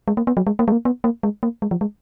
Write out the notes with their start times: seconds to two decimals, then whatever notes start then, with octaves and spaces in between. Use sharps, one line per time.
0.08 G#3
0.17 A#3
0.27 B3
0.37 F#3
0.47 G#3
0.59 A#3
0.68 G#3
0.72 A#3
0.85 B3
1.04 A#3
1.23 G#3
1.43 A#3
1.62 G#3
1.71 F3
1.81 G#3